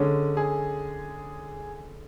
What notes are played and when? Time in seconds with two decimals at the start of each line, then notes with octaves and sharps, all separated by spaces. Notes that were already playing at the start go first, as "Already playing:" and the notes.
Already playing: D3 G#3 C#4
0.37 G#4